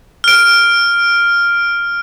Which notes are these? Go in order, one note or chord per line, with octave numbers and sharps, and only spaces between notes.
F6 D7